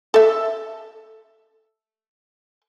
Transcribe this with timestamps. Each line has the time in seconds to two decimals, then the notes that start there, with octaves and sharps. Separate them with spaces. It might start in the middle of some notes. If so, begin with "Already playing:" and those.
0.14 A4 E5